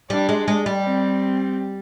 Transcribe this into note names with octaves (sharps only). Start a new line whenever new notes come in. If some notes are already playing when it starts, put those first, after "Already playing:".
G3 D4
G#3
G#3
G3
C4